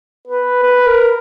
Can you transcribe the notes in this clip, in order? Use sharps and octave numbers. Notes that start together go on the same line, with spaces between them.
B4
B4
A#4